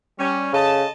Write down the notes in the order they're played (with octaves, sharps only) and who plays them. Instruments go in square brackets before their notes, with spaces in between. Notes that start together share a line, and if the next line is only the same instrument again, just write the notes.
[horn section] G3 C#4
[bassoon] C#3 [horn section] A4 D#5 A5